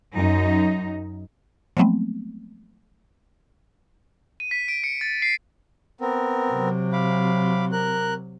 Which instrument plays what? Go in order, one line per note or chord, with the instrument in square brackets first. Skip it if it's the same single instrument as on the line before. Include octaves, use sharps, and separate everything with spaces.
[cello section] F#2 D#4
[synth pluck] F3 F#3 G#3 A3 B3 C4
[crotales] D#7
B6
D7
C#7
A6
C7
[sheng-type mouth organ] B3 C4 A#4
[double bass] C3 F#3
[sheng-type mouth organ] F5 B5 D6
A#4 F#6